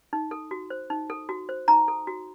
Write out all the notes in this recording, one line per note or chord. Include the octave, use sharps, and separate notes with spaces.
D#4
A4
F#4
C5
D#4
A4
F#4
C5
D#4 A#5
A4
F#4